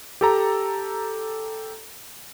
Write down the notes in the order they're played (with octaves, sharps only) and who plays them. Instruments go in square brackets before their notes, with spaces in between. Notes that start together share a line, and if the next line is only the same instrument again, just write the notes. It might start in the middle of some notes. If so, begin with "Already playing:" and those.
[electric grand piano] G4 A4 A#5